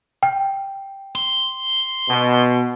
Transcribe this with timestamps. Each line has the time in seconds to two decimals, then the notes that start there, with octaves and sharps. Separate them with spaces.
0.23 G5
1.15 C6
2.10 B2